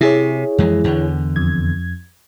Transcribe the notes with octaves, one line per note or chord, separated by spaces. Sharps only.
C3 E4 G#4 C#5
F2 E3 G#3
E2 D3
F2 G#6